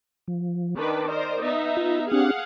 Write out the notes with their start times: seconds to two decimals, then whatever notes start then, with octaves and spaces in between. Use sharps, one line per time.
0.28 F3
0.78 D#3 D4 B4 A5 D6
1.08 A#4 C5 D5 D#5
1.41 B3 D#4 E5
1.77 F4
2.11 C4 D4 G4 G#4 F5 F#5